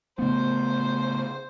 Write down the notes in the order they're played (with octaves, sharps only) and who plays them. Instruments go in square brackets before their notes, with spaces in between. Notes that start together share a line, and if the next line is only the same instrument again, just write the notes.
[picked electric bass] C#3 A3 B3 [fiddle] C5